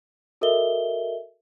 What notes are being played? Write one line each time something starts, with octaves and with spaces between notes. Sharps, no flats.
F#4 A4 A#4 D#5 E5 G7